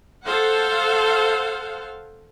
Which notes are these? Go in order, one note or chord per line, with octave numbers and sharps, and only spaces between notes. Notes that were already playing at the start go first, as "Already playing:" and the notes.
A4 C5 F5 F#5